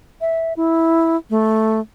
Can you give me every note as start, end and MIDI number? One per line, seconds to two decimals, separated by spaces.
0.21 0.53 76
0.57 1.17 64
1.30 1.80 57